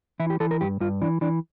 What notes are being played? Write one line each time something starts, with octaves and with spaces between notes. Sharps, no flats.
E3 E4
G4
E3 A4
A#4
G2 G4
G2 F4
E3 D4
E3 D4